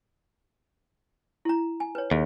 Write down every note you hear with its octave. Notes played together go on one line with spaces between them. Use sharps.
E4 A#5
G#5
B4 C#5
D#2 G#4